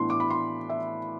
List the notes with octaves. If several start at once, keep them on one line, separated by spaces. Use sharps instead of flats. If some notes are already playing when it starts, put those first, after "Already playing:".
Already playing: A2 E3 B3 D4 C6
D6
B5
C6
E5